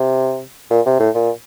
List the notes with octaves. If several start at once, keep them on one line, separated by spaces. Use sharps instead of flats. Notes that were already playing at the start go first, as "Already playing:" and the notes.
Already playing: C3
A#2
C3
A2
A#2